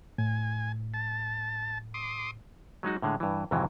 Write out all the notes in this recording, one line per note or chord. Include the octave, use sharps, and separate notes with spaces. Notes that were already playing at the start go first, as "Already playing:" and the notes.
A2 G#5
A5
C6 D6 D#6
F#3 G#3 D#4 F#4
A2 D3 G#3
G2 E3
F2 G#2 C3 D#3 E3 F#3